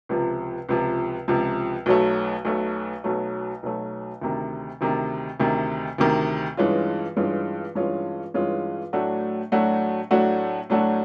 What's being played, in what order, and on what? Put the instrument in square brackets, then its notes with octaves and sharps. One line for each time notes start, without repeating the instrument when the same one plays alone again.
[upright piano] C#2 C3 F3
C#2 C3 F3
C#2 C3 F3
B1 B2 F#3 A3
B1 B2 F#3 A3
B1 B2 F#3 A3
B1 B2 F#3 A3
D2 C3 D#3
D2 C3 D#3
D2 C3 D#3
D2 C3 D#3
G2 E3 G#3 C#4 F4
G2 E3 G#3 C#4 F4
G2 E3 G#3 C#4 F4
G2 E3 G#3 C#4 F4
A2 F#3 A3 D4 F#4
A2 F#3 A3 D4 F#4
A2 F#3 A3 D4 F#4
A2 F#3 A3 D4 F#4